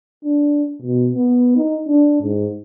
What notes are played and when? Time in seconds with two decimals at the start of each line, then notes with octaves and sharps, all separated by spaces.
0.25 D4
0.82 B2
1.14 B3
1.56 D#4
1.88 D4
2.22 G#2